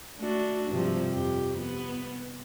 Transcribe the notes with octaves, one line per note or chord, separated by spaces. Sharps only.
A3 D4 F#4
G2 C3 F3
F2 G4
B3